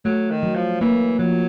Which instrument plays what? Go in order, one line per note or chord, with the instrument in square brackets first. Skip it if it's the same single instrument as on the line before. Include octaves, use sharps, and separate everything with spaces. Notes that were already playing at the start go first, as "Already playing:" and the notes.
[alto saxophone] F#3 [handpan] A3
[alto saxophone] D#3
[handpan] F#3
[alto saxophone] F3
[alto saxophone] E3 [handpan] A#3
[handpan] F3 [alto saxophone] F#3